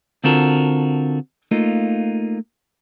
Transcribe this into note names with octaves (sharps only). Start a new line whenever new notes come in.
D3 C4 F4 F#4 A4 A#4
A3 A#3 D#4 F4